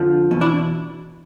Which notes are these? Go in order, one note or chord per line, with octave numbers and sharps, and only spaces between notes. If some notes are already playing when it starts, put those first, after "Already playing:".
Already playing: F2 D3 F3
E2 B2
D4 E4